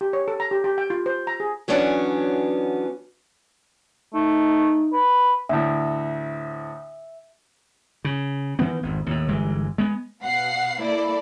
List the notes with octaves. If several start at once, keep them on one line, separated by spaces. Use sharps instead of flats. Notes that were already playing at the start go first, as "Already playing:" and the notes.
G4
C#5
A4
A#5
G4
G4
G5
F4
C5
A#5
G#4
E3 F#3 B3 C#4 D4 F#4
A3 D#4
B4
D2 A2 E5
C#3
D#3 E3 B3 C4
G#1 F2
D#2 A2
G1 E3 G#3
G#3 B3
B2 F5 F#5 C7
A#3 E4 A4 D5